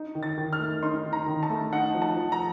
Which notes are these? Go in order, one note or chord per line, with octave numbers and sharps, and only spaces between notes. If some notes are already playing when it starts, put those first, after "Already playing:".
Already playing: D#4
D#3
A6
D#3
F6
A3
D#4 C6
D#3
A#5
D#3
A5
A3
D#4 F#5
F3
A5
F3
A#5